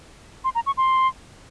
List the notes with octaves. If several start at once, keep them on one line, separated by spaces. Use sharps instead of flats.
C6
A#5
C#6
C6